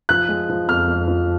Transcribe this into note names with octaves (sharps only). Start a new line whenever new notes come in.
F3 F#6
G#3
F3
F2 F6
F2
F3